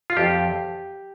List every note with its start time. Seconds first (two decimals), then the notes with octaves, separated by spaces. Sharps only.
0.10 F4
0.17 F2 G4